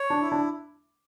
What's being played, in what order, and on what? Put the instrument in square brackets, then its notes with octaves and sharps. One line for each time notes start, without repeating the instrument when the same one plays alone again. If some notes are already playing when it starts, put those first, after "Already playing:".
Already playing: [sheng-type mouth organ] C#5
[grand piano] D4
[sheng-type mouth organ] E4
[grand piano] D4